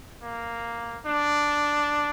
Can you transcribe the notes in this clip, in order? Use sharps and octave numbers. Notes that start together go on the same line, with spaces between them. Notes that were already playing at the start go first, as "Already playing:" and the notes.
A#3
D4